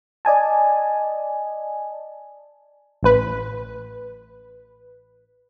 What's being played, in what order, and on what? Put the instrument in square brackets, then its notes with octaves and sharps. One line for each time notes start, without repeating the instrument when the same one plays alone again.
[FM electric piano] D5 D#5 G#5 A5
[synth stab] A1 B4